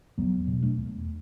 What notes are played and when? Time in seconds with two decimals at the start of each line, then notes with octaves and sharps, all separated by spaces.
0.18 E2 F#3 B3
0.47 B2
0.62 A3 D4
0.78 E2